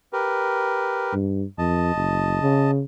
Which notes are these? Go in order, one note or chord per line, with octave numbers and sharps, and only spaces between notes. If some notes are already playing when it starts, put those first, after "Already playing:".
G4 A#4 B4
G2
F2 D#5 A5
F#1
C#3